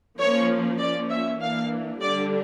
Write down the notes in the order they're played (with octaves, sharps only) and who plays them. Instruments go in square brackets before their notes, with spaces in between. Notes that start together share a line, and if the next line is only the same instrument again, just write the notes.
[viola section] F3 A#3 C#4 C#5
F3 A#3 C#4 D5
E5
E3 A#3 D4 F5
D3 G3 D4 D5